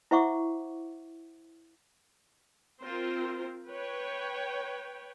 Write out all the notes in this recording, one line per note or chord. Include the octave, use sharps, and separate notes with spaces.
E4 C5 E5 F#5 C#6 D6
C4 F4 A#4 C5
B4 C#5 G5